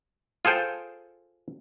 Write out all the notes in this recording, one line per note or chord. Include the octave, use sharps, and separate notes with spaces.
F4 G#4 A4 C5 G5